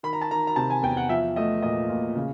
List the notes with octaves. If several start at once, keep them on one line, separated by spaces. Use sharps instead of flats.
D#3 B5
A#5
A5
D#3 A#5
A#5
C3 A5
G#5
E2 G5
F#5
F3 E5
A3 D#5
A#2 D#5
A#2
C#3